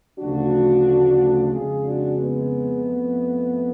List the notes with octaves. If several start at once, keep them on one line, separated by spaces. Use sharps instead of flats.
D2 C#3 F3 A3 D4 F#4
F2 C#3 G#3 F4 G#4
D4 F#4
B3
F2 F3 A3